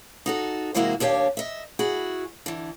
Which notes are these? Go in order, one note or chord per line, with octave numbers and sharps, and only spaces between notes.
D#4 F#4 A4
C3 E3 G#3 A#3 E4 F#4
D#2 D4 G4 C#5 F5
D#5 E5
E4 F#4 G#4
D3 E3